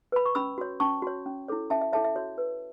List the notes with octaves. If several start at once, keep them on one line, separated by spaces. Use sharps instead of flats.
B4 B5
C#6
C#4 B5 E6
F#4 C#5
C#4 A5 C#6
F#4 C#5
C#4
E4 A4 C#5
C#4 E5 A5
E5
E4 A4 C#5 E5 A5
E5
F#4 C#5
B4